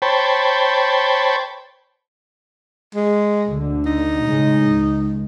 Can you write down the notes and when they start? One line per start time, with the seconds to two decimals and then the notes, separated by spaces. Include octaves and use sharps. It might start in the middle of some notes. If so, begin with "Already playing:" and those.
0.02 C5 C#5 G5 A5 B5
2.95 G#3
3.47 D2 D3
3.86 D#4
4.26 A2 C#3 G#3
4.71 C#2